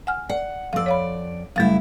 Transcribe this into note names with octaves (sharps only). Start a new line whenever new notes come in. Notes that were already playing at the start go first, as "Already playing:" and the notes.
F#5 G#5 F6
D5 F#5
F2 D5 F5 E6
C#5 F5 B5
F#2 C#3 G3 A3 E4 F5